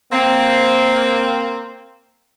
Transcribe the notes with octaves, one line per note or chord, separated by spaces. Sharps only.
A#3 C4